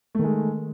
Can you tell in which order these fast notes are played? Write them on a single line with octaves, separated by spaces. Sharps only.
A3 D#3 G#3